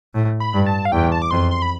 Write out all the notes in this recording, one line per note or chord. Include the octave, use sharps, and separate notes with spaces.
A2
B5
G2
A5
F5
E2 G5
A5
D6
F2 C6
C6
B5